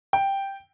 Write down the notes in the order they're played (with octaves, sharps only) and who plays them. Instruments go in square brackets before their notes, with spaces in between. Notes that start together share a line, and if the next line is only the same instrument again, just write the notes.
[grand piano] G5